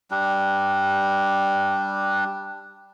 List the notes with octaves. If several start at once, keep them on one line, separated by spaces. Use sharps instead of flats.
G3 D4